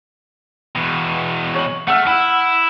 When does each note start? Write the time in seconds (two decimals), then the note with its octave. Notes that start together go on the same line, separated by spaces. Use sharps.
0.75 E2 B2
1.55 C#5 F#7
1.88 A3 F#5 E6 F6
2.07 E4 F#5